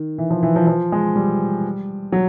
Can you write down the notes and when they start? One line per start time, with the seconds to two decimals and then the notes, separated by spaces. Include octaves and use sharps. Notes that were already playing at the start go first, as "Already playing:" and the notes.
Already playing: D#3
0.18 E3
0.30 F3
0.43 E3
0.56 F3
0.67 F3
0.92 G#3
1.16 G3
2.12 F#3